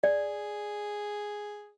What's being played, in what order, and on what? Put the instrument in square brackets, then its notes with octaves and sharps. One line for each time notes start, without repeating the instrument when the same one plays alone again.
[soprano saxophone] G#4 [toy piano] D5